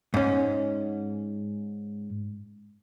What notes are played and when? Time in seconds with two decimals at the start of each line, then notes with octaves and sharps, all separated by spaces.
0.14 G#2 C#4